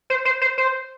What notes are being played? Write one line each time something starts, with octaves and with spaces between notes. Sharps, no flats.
C5
C5
C5
C5